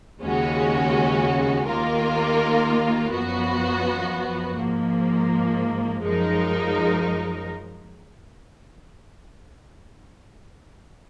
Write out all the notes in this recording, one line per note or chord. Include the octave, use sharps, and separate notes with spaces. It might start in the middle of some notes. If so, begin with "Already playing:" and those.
D#2 C#3 G#3 C#4 F#4
D#2 D#3 A#3 F4 A#4
F#2 F3 B3 F#4
G#2 F3 A#3
F#2 F3 G#3 D#4 A#4